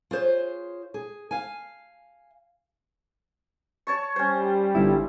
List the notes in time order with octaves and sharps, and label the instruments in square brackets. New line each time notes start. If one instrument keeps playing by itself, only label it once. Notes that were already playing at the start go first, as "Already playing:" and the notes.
[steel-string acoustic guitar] F4 G#4 C5 C#5
G#4
F5 G#5
[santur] C#5 A5 C#6
[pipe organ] G3 [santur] C#4 C5
[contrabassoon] G1 [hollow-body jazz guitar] E4